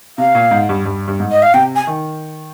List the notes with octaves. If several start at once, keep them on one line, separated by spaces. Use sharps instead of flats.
C3 F5
A#2
G#2
G2
G2
G2
G#2
D#5
F5
C3 G5
G#5
D#3